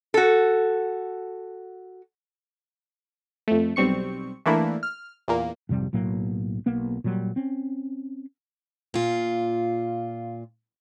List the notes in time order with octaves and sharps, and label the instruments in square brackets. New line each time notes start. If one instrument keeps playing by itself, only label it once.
[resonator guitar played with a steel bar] F#4 A4
[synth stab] F2 A3
B1 G3 C4 C#6 C#7
E3 A3 A#3 D4 E4
F6
E2 A#2 A#3
[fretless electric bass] G#1 F2 C3 G3
B1 A2 F#3 A#3
B1 A#3 B3
A#2 F#3 G3
C4 C#4
[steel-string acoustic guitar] A#2 F4